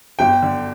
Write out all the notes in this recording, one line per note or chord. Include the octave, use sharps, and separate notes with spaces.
G1 G5
D3